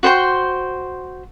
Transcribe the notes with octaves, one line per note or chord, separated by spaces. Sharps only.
F#4 C5 G5 C6